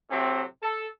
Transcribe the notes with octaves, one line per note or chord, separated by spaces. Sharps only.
A2 C3 F#3 C4
A4